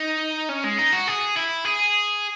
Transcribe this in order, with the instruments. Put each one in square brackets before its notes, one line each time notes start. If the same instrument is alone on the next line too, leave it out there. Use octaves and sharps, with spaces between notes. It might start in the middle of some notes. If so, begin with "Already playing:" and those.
Already playing: [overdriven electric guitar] D#4
C#4
G#3
D#4
F#4
G#4
E4
G#4